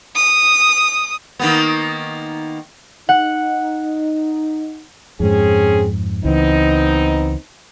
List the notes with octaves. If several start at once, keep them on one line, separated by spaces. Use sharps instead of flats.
D#6
D#3 A#3 B3
D#4 F#5
F2 G#2 C4 C#4 G#4
C#2 E3 B3 C4 D#4